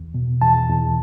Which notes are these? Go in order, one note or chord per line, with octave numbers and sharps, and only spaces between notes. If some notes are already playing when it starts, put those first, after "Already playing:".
Already playing: E2
B2
E2 A5
E2